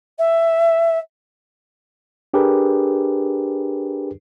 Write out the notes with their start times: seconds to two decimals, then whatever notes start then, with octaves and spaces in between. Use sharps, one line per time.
0.18 E5
2.34 D4 G4 G#4 A#4 B4